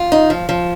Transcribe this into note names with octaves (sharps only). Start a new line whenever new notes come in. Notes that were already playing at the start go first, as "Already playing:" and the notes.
Already playing: F4
D#4
F3
F3